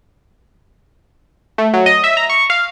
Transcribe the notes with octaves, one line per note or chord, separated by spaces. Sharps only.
A3
F#3
D#5
E5
A#5
C#6
F5